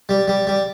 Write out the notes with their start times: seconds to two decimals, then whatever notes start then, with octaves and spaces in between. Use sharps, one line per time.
0.09 G3
0.28 G3
0.47 G3